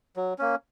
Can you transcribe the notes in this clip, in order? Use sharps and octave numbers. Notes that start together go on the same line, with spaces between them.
F#3
A#3 C#4